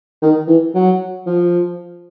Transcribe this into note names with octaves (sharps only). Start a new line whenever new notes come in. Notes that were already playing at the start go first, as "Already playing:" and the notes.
D#3
E3
F#3
F3